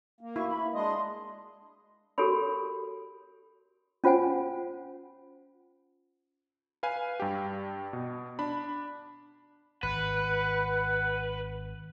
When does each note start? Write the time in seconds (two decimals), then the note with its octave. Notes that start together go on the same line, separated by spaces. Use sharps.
0.21 A#3
0.36 E4 F#4 C#6
0.48 E5 B5
0.74 G#3 D4 D#5 C6 D#6
2.18 F#4 G4 A4 A#4 C#5 B5
4.04 C#4 F4 C5 F#5 G#5
6.83 B4 F5 G#5
7.20 G2 G4
7.93 B2
8.39 D4 B5
9.83 G#1 B4 F#5